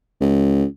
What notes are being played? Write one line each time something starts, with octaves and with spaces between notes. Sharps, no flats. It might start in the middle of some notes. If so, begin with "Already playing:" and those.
C#2